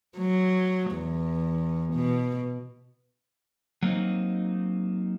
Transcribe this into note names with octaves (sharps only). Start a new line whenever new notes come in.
F#3
E2
B2
F#3 A#3 C4 D#4